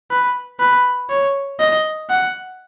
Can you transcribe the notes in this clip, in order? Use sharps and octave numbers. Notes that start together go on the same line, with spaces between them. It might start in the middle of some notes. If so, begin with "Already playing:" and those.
B4
B4
C#5
D#5
F#5